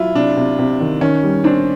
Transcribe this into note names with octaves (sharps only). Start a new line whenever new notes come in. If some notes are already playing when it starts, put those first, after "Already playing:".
Already playing: F#3 E4 F4
C3 D4
C3
C3
D#3
D#3 C#4
G3
C4 D4